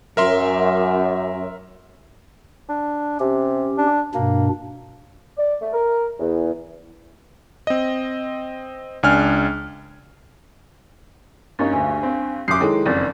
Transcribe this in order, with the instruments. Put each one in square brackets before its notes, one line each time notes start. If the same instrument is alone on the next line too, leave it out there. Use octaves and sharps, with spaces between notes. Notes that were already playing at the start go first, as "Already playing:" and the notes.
[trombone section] F#2 [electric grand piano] A#4 E5 C6
[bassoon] D4
[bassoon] C3 [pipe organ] C#4 G4
[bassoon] D4
[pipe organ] G2 B2 D4 [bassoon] A#3
[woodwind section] D5
A3
A#4
E2
[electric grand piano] C4 D#5
C#2 D4 G#5 F6
[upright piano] G2 [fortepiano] A#3 C#4 D#4 [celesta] A6
[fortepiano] D2 [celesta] G#5
[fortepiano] C4
[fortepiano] F#2 E5 C6 [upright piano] D6 C7 [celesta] D#6 F#6 G6
[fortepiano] D#3 [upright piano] G#3 [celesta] E4 A4 C#5
[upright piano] F#1 F2 [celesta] D5 A6